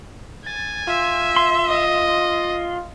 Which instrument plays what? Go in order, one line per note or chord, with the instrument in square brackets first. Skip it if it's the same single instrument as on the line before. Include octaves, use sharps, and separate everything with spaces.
[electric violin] G#5 [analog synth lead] A6
[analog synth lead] F4 [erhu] E5
[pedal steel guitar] C6
[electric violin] D#5